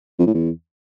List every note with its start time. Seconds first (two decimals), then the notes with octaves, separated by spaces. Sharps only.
0.19 F2
0.27 A2
0.34 E2